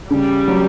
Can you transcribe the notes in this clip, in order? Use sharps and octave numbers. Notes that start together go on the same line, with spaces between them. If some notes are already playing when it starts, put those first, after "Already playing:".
C#3 G3
F#3